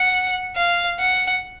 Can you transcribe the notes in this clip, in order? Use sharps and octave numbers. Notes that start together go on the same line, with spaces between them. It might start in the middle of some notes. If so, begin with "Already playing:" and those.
Already playing: F#5
F5
F#5